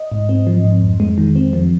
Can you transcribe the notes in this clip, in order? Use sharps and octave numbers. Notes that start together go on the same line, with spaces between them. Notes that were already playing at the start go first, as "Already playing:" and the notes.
Already playing: D#5
G#2
C4
F3
G#2
F2
G#3
D#3
C4
F3